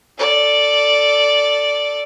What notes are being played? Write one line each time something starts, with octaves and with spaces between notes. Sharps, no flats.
A4 D5